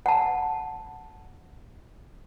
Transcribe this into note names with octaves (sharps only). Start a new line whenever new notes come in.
F#5 A5